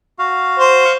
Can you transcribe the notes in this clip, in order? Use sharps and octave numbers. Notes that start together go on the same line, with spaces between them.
F#4 F5
C5
F5 C#6